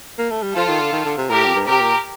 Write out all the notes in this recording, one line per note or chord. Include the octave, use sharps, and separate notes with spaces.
A#3
A3
G3
F3 F4 A4
D#3
D3
D#3
D3
C3
A2 G4 A#4
F2
G2
C3 G4 A#4
A#2